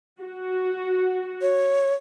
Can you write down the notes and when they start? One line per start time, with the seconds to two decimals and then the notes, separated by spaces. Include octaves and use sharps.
0.21 F#4
1.41 C#5